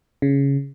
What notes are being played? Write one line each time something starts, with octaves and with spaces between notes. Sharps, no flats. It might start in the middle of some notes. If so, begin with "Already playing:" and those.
C#3